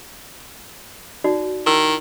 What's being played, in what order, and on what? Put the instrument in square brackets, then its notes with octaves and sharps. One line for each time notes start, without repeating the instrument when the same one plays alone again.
[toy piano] D#4 F#4 D5
[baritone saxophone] D#3 [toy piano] E4 A5 E6